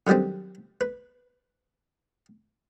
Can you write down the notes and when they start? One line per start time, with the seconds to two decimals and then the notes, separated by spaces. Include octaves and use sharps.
0.07 D3 D#3 F#3 G3 C4
0.81 B4